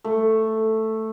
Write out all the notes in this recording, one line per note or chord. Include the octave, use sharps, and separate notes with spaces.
A3